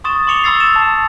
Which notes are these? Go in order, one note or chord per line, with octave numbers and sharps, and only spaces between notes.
C6 C#6 D#6 A6 E7
C6 D6 C#7 F7 G7
B5 C6 E6 A6 C7
E7
A5